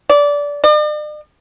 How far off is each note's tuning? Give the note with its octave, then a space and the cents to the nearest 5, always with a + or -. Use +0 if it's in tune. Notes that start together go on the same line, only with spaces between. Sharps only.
D5 -20
D5 +45